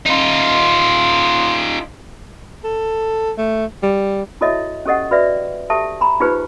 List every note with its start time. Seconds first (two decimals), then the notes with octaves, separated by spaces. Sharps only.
0.06 D#4 F4
2.64 A4
3.38 A3
3.83 G3
4.41 E4 F#4 A4 C#5 D#5 E5
4.85 C#4 G4 A4 D#5 F#5
5.11 F#4 B4 D5 E5
5.70 G4 A4 E5 A5
6.01 G#5 A#5 B5
6.20 D#4 F4 G4 G#4 B4 C5